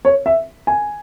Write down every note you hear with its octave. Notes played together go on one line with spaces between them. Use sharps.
C#5
E5
G#5